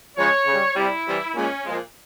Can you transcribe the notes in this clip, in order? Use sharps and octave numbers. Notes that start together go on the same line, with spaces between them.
C#3 F3 G#3 C#5
C#3 G3
C3 G3 E4
C3 E3 G3
A#2 G#3 C#4
A#2 F3 G#3